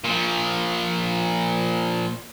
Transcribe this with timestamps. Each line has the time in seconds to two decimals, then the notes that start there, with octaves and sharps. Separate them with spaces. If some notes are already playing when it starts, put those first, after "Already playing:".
0.04 A#2 F3